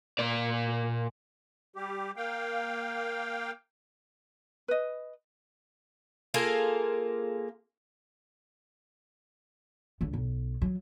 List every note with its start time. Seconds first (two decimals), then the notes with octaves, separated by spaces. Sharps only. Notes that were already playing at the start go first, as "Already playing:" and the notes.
0.19 A#2 D5
1.76 G3 G4
2.17 A#3 F5 G5
4.68 B4 D#5
6.34 A#3 F4 G#4 A4
10.01 C#2 D3
10.13 B1
10.62 F#3